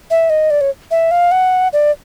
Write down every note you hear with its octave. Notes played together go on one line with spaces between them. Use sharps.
E5
D#5
D5
C#5
E5
F5
F#5
D5